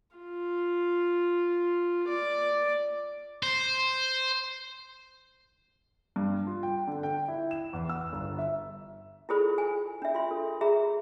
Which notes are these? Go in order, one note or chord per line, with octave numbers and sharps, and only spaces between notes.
F4
D5
C5
G2
F4
G5
D3
G5
E4
E7
E2
E6
G1
E5
E4 F4 G#4 A4 C5 B5
G#5
D4 E5
F4 C6
A4
G#4 E5 A#5 B5